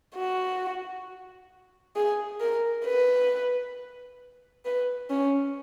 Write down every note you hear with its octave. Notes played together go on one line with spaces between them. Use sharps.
F#4
G#4
A#4
B4
B4
C#4